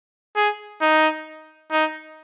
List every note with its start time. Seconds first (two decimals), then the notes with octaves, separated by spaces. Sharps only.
0.36 G#4
0.81 D#4
1.72 D#4